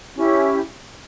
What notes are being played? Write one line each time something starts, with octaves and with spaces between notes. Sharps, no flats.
C#4 E4 G4